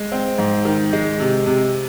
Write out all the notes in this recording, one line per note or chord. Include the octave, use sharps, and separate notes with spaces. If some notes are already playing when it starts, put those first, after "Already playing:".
Already playing: G#3
C4
G#2
D#3
G#3
C3
C3